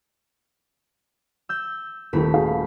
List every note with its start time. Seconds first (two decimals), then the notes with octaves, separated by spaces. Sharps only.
1.49 E6 G6
2.13 D#1 A3 A#3 F4 G4 B5
2.34 F#4 G#4 F5